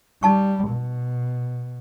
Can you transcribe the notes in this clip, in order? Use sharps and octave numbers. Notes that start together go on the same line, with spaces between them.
G3 D#4 A5 C#6
B2